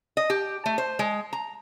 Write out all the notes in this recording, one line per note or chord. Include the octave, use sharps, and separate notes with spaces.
D#5
G4
A3
C5
G#3
A#5